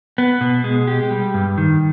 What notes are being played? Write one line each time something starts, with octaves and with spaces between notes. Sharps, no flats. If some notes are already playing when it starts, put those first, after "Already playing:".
B3
B2
G#3
G4
G3
G2
D#3